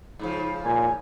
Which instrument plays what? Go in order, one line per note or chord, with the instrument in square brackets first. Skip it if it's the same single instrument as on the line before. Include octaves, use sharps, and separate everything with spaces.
[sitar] G#2 C#3 F3
[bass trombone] A#2 [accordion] G#5